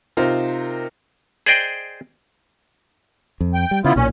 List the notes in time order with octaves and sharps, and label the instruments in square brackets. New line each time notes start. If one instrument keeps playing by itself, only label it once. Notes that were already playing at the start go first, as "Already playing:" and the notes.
[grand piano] C3 D#4 F4 A#4 C5
[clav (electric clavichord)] G#4 C5 D5 D#5 G5
[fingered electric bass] F2
[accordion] G5
[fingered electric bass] G3
[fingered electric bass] C#3 [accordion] B3 E4 F4
[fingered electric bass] B1 A#2 [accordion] C#4